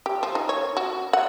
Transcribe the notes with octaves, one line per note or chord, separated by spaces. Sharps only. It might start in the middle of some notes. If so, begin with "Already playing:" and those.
G4
F3
D#4
C#5
F#4
F#5